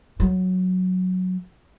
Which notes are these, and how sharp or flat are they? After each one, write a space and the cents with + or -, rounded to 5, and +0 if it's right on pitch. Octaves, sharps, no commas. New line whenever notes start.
F#3 -5